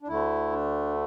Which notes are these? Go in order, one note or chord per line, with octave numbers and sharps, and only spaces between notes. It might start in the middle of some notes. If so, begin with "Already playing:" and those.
D4
D2 D3 A3 E4
D4